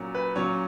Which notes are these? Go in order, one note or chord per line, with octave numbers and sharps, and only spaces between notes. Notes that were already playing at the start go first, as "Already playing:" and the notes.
Already playing: A#2 F#3 C#4
B4
A#2 F#3 C#4 C#5